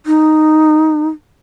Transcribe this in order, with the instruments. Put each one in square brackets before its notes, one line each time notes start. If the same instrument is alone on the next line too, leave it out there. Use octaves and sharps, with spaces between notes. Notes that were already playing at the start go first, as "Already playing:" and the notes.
[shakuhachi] D#4